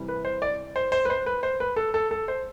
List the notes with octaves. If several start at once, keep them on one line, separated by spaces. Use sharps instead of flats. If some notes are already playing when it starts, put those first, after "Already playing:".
Already playing: C3 E3 G3
B4
C5
D5
C5
C5
B4
C5
B4
C5
B4
A4
A4
A4
C5